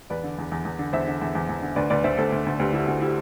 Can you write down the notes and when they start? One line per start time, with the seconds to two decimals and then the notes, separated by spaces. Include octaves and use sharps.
0.10 E2 B4 D5
0.23 D3
0.38 E2
0.52 E2
0.65 E2
0.79 D3
0.93 E2 C5 E5
1.08 D3
1.21 E2
1.35 E2
1.49 E2
1.62 D3
1.76 D2 B4 D5
1.90 D2 B4 D5
2.04 D2 C5 E5
2.18 D2 A4 C5
2.32 D2
2.46 D2
2.59 D2 G4 B4
2.73 D3 E4 G4
2.87 D2 F#4
3.01 E4 G4